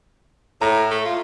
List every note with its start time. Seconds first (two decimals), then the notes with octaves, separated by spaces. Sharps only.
0.61 A2 A#5
0.91 A3
1.05 F4